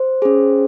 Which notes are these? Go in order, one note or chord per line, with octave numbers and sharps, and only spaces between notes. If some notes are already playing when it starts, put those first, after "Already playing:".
Already playing: C5
C#4 G#4